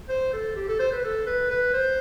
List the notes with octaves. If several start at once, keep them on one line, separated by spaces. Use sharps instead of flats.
C5
A4
G4
A4
C5
B4
A4
B4
B4
C5